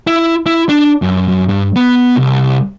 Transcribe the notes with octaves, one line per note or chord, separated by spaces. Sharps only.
E4
E4
D4
F#2
F#2
G2
B3
C2